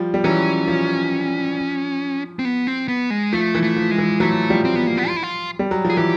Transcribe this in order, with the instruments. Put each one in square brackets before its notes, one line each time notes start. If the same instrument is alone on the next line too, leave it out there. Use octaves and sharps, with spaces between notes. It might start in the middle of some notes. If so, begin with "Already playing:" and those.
Already playing: [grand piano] F3 G3
G3
[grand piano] E3 F#3 [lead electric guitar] C#4
[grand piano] F3
[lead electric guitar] C4
B3
C4
B3
G#3
[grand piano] F3 [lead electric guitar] A3
[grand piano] E3
[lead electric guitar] A3
[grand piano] F3
[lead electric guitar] G#3
[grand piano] E3
[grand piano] E3 F#3 [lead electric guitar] A3
[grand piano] F3 G3
[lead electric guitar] C4
B3
A#3
B3
F4
E4
F4
[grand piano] G3
F#3
F3
[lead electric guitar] G#4
[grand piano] E3 [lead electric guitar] G4